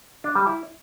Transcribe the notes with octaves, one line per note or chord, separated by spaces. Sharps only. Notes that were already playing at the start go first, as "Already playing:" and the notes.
D4
G3
E4